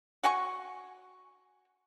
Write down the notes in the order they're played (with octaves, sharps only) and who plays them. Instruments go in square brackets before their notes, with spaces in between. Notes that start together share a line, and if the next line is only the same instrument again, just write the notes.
[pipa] F#4 F#5 G#5 C#6